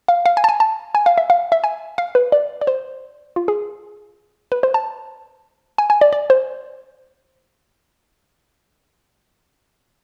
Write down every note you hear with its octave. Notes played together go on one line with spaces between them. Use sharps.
F5
F5
G#5
A5
G#5
A5
G#5
F5
E5
F5
E5
G#5
F5
B4
D5
D5
C5
F4
G#4
B4
C5
A5
G#5
G#5
D5
D5
C5